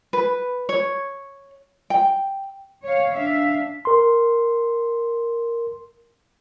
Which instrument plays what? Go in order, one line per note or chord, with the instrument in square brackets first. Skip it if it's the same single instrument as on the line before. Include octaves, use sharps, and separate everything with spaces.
[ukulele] B4
C#5
G5
[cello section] C#5 F5
D4 E5 F5
[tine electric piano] A#4 C6